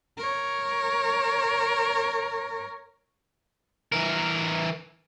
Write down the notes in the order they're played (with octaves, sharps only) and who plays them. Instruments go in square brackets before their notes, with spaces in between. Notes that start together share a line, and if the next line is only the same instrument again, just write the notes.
[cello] A#4 C#5
[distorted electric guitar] E3 A#4